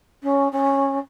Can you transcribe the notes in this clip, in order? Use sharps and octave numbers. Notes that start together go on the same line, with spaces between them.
C#4
C#4